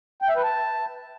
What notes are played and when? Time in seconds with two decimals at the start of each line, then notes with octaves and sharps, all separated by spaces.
0.22 G5
0.29 E5
0.36 B4
0.43 A5